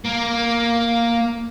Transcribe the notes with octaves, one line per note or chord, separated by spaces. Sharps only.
A#3